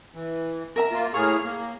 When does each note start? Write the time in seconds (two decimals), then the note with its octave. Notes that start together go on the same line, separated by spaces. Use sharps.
0.15 E3
0.76 A#4 E5 A#5
0.91 A#3 F4
1.14 A2 G#4 C#6 F6
1.44 A#3